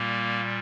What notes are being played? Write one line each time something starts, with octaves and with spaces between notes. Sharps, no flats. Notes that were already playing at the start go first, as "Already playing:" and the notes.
Already playing: A#2 G3 A#3